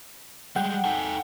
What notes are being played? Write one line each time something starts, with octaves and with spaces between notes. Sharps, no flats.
G3 G#3 F#5 G5
D#4 A4 G#5